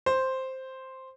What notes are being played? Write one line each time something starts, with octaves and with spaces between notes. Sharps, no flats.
C5